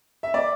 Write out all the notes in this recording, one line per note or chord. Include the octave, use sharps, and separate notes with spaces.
E5
D5